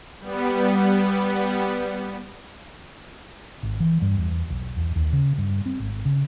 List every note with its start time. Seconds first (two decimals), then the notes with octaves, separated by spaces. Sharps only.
0.20 G3 B3
3.63 G#1
3.80 E3
4.02 G2
4.18 E2
4.50 B1
4.76 E2
4.96 D#2
5.13 C#3
5.38 G2
5.66 C4
5.80 G#1
6.05 C#3